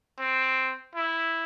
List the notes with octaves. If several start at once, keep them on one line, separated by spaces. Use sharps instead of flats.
C4
E4